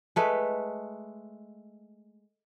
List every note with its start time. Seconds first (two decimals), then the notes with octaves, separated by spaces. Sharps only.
0.16 G#3 A3 B4